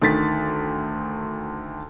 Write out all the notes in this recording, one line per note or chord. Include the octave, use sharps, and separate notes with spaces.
D2 D#3 A6 B6